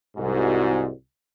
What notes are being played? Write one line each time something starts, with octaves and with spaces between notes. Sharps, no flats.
C2 G#2 F#4